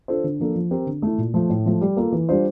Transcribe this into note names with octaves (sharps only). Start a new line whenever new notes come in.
D4 F4 A4 C5
D3
F3 A#3 D4 A4
F3
C4 G4 A#4
D3
A3 E4
A#2
F3 A3
A2
F3 A3
G3
A#3 F4 A4
E3
G3 D4 F4 C5